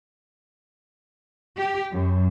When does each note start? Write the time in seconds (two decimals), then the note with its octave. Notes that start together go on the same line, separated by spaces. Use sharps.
1.57 G4
1.91 F#2